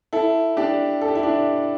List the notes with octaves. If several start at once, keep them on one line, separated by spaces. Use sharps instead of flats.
E4 A4
D4 G4
A4
G4
E4
D4 G4